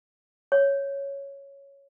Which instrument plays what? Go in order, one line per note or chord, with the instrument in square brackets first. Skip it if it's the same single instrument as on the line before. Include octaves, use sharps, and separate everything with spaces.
[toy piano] C#5